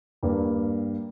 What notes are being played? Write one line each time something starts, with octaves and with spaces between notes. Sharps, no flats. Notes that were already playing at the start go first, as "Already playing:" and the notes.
G2 G3 A#3